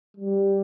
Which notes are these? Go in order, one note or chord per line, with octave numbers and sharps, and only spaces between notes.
G3